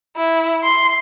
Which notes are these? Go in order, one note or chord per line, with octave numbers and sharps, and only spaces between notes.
E4
C6